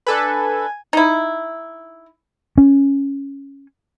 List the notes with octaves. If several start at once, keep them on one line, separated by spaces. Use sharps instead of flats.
D4 A4 B4 G#5
D#4 E4
C#4